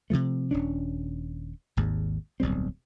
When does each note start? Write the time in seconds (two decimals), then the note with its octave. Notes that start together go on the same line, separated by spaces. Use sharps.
0.10 C3 E3 F3 A3
0.51 D#1 C#4 D4
1.77 G#1 D#2 G#2
2.40 D1 B1 G3 C4